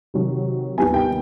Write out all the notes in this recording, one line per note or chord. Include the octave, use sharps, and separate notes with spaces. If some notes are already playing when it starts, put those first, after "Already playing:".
C3 D#3 F#3
D#2 D#3 G3 B3 G#5
G5